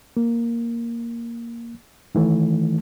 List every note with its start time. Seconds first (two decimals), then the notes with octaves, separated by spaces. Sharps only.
0.17 A#3
2.15 D#3 E3 A3